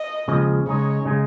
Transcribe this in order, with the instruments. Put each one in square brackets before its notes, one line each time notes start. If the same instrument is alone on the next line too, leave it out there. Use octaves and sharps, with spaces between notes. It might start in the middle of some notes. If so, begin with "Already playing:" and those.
Already playing: [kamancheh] D#5
[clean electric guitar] D#2 C#3 F3 G#3
[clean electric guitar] C#3 G#3 D#4 [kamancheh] C#5
[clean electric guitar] C#3 G#3 D#4